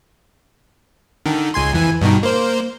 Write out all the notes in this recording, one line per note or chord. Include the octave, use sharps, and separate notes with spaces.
D3 D#3
C#2 G#5 C6
F2 E3 G#5
G2 B2 D#3
A#3 C5